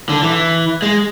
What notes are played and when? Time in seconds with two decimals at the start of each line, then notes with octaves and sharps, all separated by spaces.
0.09 D3
0.23 E3
0.82 G#3